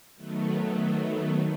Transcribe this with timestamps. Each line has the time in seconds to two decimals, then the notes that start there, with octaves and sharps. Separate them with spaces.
0.16 D#3 F#3 A3 B3